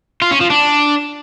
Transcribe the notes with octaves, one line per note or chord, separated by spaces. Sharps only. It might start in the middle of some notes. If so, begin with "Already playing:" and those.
F4
C#4
F3
D4